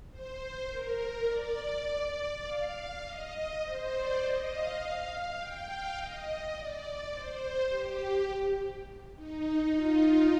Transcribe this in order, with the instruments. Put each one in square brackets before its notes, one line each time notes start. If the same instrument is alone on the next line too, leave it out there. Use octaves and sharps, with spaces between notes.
[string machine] C5
A#4
D5
D5
F5
D#5
C5
D5
D#5
F5
G5
F5
D#5
D5
C5
G4
D#4
F4